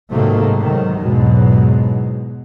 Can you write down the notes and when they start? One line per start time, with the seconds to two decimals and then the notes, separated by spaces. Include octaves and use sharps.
0.11 G#2 C3 D#3 F#3 A3 A#3
0.59 G#2 C3 D#3 F#3
0.99 E2 G#2 B2 F#3 G#3